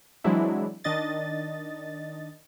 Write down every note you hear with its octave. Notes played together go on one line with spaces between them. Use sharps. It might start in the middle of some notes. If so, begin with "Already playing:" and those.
E3 F#3 G#3 C4 D4 E4
D#3 D4 D#5 A6